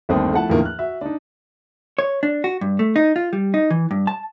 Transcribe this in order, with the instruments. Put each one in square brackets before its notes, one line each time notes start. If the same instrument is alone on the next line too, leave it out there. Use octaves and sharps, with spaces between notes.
[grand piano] G1 D#2 A3 C4 D4 D#6
F3 A3 E4 F#5 A5
E2 A2 D3 D#3 F3 A#3
F6 F#6
F#4 E5
D4 D#4
[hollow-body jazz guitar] C#5
D4
F#4
G2
A3
D#4
F4
G3
D#4
E3
G2
A5